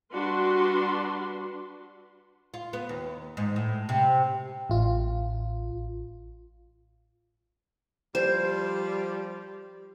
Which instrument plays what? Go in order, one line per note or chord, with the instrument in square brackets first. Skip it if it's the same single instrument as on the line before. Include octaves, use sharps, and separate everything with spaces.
[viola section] G3 D4 F#4 B4 C6
[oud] F4
B3
D#2
G#2
A2
C3
[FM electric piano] A1 F4
[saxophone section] F3 G3 [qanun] C5